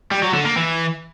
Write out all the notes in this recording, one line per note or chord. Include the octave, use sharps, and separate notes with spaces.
G3
F#3
D3
A#3
E3